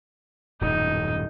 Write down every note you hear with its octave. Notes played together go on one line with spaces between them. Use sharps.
D#1 F#2 A2 D#4